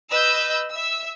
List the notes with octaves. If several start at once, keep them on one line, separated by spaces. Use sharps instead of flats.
B4 D#5 E6 G6
E5 E6